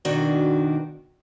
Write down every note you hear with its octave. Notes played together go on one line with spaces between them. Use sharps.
B2 D#3 D4 F#4 A#4